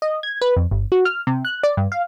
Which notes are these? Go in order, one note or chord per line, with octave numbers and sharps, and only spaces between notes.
D#5
G#6
B4
F2
G1
F#4
F6
C3
F#6
D5
G2
F5